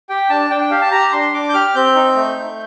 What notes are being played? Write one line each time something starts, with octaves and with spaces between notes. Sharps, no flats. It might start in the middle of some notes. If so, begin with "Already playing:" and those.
G4 G5
D4 A5
D4 G5
G5
G4 F5
A5
G4 A#5
D4 C6
D4 D6
G6
G4 F6
C4 G6
D#4
A3
A3